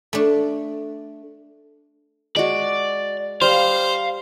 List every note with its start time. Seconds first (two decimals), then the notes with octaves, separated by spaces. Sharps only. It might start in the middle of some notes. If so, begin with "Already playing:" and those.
0.13 A3 D4
2.36 G#3 F#4 D5
3.42 G3 C5 F5 A#5